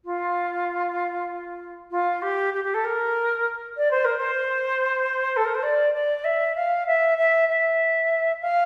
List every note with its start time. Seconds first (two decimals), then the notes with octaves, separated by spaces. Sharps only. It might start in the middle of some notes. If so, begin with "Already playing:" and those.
0.04 F4
1.91 F4
2.22 G4
2.53 G4
2.64 G4
2.74 A4
2.84 A#4
3.77 D5
3.90 C5
4.04 A#4
4.17 C5
5.36 A4
5.44 A#4
5.54 C5
5.63 D5
5.93 D5
6.24 E5
6.55 F5
6.86 E5
7.17 E5
7.48 E5
8.41 F5